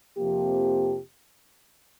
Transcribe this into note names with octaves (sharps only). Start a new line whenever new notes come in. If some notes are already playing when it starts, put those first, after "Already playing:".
F2 C3 F3 A#3 G4